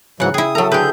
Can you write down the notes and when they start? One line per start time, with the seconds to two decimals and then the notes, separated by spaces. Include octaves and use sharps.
0.20 G#2 C#3 E3 F#3 F#5
0.34 E4 G#4 G5 D#6
0.55 F#3 A4 E5 A5 A#5
0.72 D3 G4 G#4 B4 G6